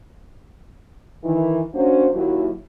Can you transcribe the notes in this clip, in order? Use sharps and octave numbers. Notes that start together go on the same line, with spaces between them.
D#3 E3
F#3 A#3 C#4 D4 F#4 C5
D#2 F#3 E4